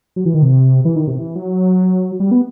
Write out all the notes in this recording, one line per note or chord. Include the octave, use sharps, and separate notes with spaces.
F#3
E3
D#3
C3
E3
D#3
C3
E3
F#3
G3
B3